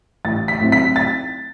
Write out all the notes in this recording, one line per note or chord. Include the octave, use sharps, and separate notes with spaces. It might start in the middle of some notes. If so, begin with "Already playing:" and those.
A1 A6
B6
A2 F#3 C4 E4
B6
A6